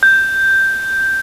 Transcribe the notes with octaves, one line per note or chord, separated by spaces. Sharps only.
G6